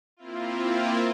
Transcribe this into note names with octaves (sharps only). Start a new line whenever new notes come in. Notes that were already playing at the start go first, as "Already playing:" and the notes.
A#3 C4 E4 F4